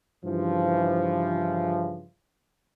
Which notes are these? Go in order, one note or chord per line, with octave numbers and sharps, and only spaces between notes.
G2 C#3 E3 F3